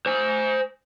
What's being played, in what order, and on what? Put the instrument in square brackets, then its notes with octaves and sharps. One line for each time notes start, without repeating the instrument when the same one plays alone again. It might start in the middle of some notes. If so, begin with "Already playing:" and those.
[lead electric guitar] C5 G#5